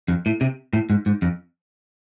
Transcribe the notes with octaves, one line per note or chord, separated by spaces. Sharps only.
F2
A2
C3
A2
G#2
G#2
F2